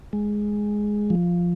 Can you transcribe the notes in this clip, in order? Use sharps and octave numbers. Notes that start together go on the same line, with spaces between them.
G#3
F3